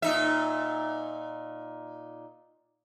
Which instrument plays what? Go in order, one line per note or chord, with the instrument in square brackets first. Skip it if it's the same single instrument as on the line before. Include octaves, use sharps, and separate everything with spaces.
[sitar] A#2 D#4 E5